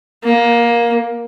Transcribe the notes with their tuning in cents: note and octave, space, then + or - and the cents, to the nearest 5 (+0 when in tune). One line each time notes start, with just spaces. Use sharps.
A#3 +15